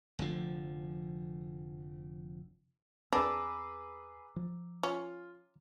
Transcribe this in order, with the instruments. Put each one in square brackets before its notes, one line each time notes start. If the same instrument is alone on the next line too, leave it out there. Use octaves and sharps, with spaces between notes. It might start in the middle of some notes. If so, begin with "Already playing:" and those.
[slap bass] F1 D3 F3
[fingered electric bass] E2 C4 [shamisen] D4 [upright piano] G#4 B4 [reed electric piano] A#5 D6 E6
[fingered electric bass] F3
[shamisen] C#4 [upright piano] F4